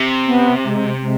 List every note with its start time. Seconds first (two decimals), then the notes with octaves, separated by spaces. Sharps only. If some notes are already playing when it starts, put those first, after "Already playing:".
Already playing: C3
0.27 B3
0.64 G#3
1.01 G#3